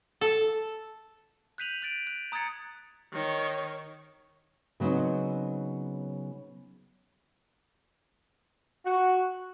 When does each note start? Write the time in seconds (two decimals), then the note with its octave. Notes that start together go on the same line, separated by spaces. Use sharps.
0.21 A4
1.58 F#6 G6 B6 D#7 F7 F#7
1.82 F#6 A6 D7
2.07 F#6
2.32 A#5 D#6 F#6 G#6 A6 C#7
3.13 D#3 C#5
4.80 C#3 F#3 B3 C4 D#4
8.86 F#4